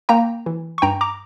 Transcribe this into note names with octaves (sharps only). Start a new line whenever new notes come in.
A#3 G5 A#5
E3
C#6
G2 G5 A#5
A#5 D6